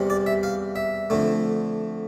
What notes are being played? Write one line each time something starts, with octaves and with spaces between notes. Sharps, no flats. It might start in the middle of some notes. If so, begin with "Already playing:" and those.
Already playing: E2 C3 G3
D5
E5
F5
E5
F2 D3 A3